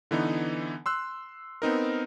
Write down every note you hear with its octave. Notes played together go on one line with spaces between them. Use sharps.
D3 E3 B3 D#4
C6 E6 F#6
B3 C4 D#4 A#4